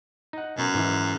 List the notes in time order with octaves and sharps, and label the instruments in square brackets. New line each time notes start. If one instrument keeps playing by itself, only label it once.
[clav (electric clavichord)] D#4 F#5
[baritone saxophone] F#2 [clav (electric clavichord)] B2
[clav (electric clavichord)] G#2 E3